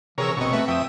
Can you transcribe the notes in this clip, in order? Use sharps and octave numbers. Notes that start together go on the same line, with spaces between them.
C3 E3 G#4 A#4 C#5 E6
G1 B2 C4 D#5 C#6
A3 B4 E5
F2 E5 G5 D#6